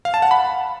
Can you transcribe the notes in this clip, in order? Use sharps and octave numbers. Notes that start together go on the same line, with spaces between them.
F5
A5
F#5
B5